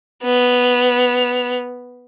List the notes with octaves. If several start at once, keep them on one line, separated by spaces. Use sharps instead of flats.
B3 F7